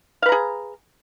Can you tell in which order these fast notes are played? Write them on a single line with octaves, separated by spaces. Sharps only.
F5 B4 A#5 G#4